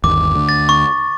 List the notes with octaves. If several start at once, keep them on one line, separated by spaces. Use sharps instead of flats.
G1 D#2 D6
D2 D3
A6
C#6